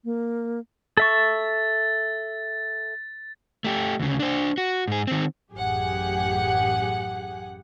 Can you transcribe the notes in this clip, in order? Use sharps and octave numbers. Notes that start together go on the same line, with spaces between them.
A#3
A4 E5 C#6 A6
A3 G4
D2 C#3
D4 C5
F#4
G#2 G#4
D#3 C4
A1 F#2 G4 G#4 F#5